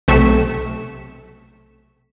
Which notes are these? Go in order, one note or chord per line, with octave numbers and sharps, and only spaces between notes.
B1 C3 A3 C#6 B6 E7